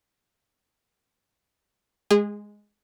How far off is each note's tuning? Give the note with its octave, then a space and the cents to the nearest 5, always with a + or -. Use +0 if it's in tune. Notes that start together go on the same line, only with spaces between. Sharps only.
G#3 +0 G#4 -25